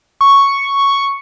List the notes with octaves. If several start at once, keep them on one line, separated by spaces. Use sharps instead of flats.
C#6